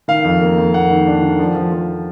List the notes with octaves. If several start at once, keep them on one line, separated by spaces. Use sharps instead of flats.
D#3 F5
F2
A#3
F2
A#3 F#5
D#3
D4
D#3
F3
F3
F3